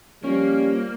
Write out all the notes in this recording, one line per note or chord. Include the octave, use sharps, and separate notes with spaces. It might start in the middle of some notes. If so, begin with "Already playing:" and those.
F3 G3 A#3 C#4